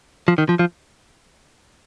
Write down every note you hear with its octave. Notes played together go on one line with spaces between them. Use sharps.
F3
D#3
F3
F3